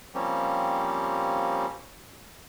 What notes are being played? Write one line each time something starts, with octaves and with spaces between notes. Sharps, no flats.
F3 G3 A#3 C4 C#4 G4